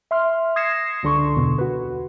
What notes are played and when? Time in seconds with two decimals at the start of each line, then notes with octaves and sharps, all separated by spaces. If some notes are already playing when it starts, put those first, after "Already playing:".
0.11 E5 C6 F6
0.56 D#6 G#6 A#6 C7 C#7 E7
1.03 C#2 D3 D4 A4 C6 C#6
1.35 E2 B2 D3
1.58 F#4 B4